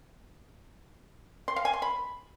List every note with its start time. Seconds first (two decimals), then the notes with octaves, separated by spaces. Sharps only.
1.48 C6
1.56 F5
1.65 G#5
1.73 C6
1.82 B5